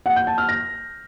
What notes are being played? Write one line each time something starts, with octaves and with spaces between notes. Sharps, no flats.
F#5
G6
A5
F6
A#6